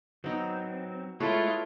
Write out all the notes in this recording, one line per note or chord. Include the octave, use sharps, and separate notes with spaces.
F#3 B3 C4 D#4
G#3 A3 E4 F4 A4 B4 C#5